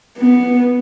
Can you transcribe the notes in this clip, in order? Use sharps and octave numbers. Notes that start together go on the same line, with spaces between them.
B3